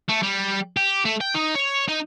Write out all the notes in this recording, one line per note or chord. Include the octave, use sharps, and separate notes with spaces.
A3
G3
G4
A3
G5
D#4
C#5
D#4